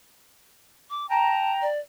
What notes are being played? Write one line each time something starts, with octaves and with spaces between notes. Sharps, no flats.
D6
G5 A5 A#5
D5